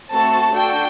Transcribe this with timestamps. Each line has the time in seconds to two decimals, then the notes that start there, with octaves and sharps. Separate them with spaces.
0.11 A3 C4 F#4 A4 A5
0.55 D4 F#4 A4 G5